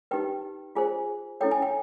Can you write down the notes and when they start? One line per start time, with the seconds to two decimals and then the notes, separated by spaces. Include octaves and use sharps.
0.11 D#4 G4 B4 G5
0.75 F4 G#4 C5 G#5
1.41 C#4 E4 A4 C#5 G5
1.51 G#5
1.62 G5